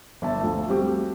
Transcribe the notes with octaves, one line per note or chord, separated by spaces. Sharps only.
G1 E5 A5
D2 F3 A3
G3 A3 C4 F#4 G4